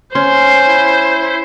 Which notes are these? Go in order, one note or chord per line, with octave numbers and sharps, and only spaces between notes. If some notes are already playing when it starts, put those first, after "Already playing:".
C#4 C5 C6
E4